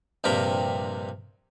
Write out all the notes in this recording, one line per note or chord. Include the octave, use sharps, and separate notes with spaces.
A#1 G2 C3 A#4 B5